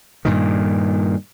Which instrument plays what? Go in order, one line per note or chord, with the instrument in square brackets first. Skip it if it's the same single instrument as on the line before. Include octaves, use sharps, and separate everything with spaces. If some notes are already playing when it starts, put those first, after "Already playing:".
[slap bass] G2 A#2 D#3